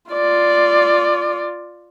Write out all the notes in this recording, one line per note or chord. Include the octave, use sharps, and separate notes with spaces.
F4 D5